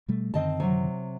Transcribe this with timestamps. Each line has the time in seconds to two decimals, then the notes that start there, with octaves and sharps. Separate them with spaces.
0.08 B2 G3 A3
0.34 F#2 D3 D#3 C4 D#5 A5
0.60 C3 F#3